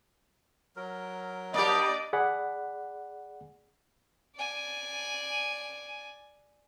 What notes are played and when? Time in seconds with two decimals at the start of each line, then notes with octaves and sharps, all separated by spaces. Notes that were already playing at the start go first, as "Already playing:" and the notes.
0.76 F#3 A#4
1.54 A#3 D4 G4 D5 D#5
2.13 G#4 D5 F#5 B5
4.36 D5 G#5